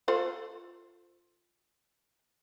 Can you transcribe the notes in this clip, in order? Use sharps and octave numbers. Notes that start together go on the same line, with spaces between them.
F4 A4 C5